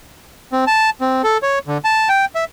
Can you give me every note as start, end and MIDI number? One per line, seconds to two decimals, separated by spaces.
0.52 0.65 60
0.67 0.90 81
1.01 1.22 60
1.24 1.38 69
1.43 1.59 73
1.67 1.78 50
1.85 2.09 81
2.09 2.25 79
2.35 2.44 76